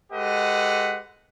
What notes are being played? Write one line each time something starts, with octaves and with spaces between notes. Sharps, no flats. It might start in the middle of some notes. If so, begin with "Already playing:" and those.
G#3 G4 A4 B4 D#5 F#5